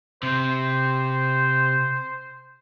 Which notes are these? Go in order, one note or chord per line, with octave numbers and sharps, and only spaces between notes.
C3 C5